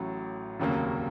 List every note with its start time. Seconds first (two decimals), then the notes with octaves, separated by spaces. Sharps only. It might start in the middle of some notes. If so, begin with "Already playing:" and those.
Already playing: A1 A2 F#3
0.60 F1 D#2 C#3 F#3 A#3